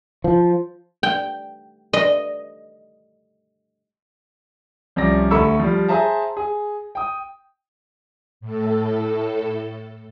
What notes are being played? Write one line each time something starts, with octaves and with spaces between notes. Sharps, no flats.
F3
G5
D#5
C2 F3 C#4 D5 A#6
D2 A4 B5 C#6 E6
F3 G3
G#4 C5 E5 A5 A#5
G#4
G5 D#6
A2 A4